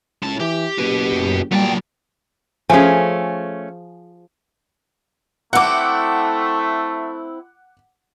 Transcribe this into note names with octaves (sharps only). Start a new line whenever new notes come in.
C#2 A2 A5
E3 G4
F#1 F#4 B4
F#2
A#2 F#3 G3 B3 G5 A5
F3 A3 C#4 G#4 G#5
A3 C4 E4 F#5 D6